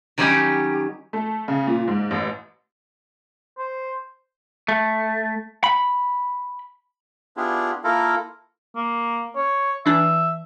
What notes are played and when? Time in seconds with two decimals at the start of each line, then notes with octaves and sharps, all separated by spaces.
0.18 D#3 F#3 G3 C#4 D#4 G4
1.13 A3
1.48 C#3
1.67 A#2
1.88 G#2
2.11 A1
3.58 C5
4.68 A3
5.64 B5
7.37 B3 D4 E4 F4 G4 G#4
7.84 A#3 E4 F4 A4 A#4
8.76 A#3
9.36 C#5
9.86 E3 D4 E5